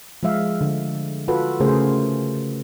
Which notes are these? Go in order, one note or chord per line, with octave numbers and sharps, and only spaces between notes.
F3 G#3 E5 F5
D3
F4 F#4 A4 B4
C#3 A3 G#4 A#4 C5